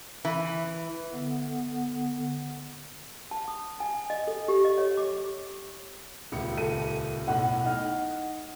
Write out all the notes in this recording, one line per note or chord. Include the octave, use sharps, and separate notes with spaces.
E3
D3 B3
A5
D#6
G#5
D#5
A4
G4
D#5
C#5
D6
D#1 C#2 C#7
A4 D#7
B1 A2 F#5
D#4 F6